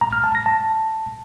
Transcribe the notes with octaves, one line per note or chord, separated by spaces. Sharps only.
A#5
F6
A5
A#6
A5